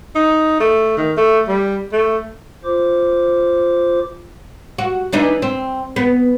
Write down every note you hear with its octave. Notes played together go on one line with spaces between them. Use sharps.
D#4
A3
D#3
A3
G3
A3
F4 C5 D6
F#4
E3 D4 D#4
C4
B3